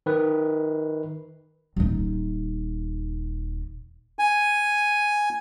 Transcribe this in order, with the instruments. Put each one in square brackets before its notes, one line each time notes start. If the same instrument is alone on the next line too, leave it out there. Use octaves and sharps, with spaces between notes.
[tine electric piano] D#3 B4
[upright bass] D#1 D#4
[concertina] G#5